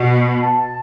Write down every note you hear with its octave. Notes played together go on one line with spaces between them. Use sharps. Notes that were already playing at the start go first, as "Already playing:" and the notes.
Already playing: B2
B5
A5